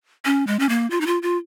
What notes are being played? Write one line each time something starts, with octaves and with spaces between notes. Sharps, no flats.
C#4
G#3
C#4
A#3
F4
D#4
F4
F4